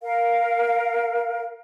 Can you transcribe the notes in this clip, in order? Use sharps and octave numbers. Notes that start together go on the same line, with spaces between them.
A#4 F5